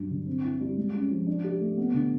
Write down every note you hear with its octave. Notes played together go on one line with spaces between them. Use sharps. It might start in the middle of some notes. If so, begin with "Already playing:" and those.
Already playing: G2 F#3
D3
C4
E4
G3
G#3
C#4
F3
D4
G4
A3
B3
D3